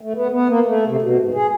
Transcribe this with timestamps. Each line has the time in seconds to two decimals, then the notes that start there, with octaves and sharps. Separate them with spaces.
0.01 A3
0.15 B3
0.31 B3
0.49 A#3
0.66 A3
0.87 C3
1.02 B2
1.19 G#2
1.34 G#4